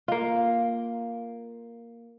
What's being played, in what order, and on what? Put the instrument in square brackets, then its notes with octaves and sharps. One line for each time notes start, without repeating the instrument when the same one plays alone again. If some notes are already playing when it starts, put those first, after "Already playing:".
[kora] A#3 F4